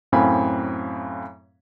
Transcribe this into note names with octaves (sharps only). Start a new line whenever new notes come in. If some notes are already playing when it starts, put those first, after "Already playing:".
F#2 A2 C4 F5 G#5 B5